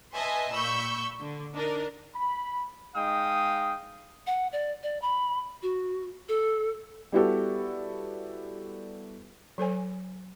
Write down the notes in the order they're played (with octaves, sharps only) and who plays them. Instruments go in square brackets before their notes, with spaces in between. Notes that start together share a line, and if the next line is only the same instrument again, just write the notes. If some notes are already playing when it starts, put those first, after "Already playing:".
[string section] B4 D#5 E5 G#5 A5 C6
A#2 B5 C#6 E6 G6
D3
D4 D#4 A#4
[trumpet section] B5
G#3 D#4 F5 G5 D#6
[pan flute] F#5
D5
D5
B5
F#4
A4
[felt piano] G3 B3 E4 F#4 G4 A4
[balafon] F#3 A4 C5 G#5